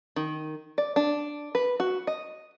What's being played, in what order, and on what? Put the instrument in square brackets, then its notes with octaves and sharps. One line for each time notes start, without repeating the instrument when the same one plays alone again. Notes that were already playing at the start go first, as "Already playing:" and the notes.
[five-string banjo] D#3
D5
D4
B4
F#4
D#5